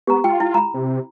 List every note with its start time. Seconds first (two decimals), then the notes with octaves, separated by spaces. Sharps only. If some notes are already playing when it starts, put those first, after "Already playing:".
0.07 B3 G4 A#5
0.24 F4 G5
0.40 E4
0.54 A#5 B5
0.74 C3